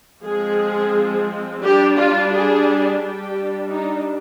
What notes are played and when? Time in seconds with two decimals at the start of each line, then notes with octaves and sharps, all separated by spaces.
0.24 F3 G#3 C4 G#4
1.63 G3 D4 G4
1.99 F4
2.33 G#4
3.02 G3 D4 G4
3.72 D#4